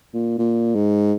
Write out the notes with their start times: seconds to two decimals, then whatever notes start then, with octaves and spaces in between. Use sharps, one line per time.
0.14 A#2
0.38 A#2
0.75 G#2